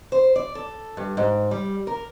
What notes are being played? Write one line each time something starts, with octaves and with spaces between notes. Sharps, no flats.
C5
D5
A4
G2
G#2
G3
A#4